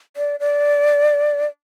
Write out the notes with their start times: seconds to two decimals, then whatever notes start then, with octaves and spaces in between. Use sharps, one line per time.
0.17 D5
0.40 D5